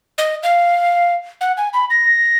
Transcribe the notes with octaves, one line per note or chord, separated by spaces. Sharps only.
D#5
F5
F#5
G#5
B5
A#6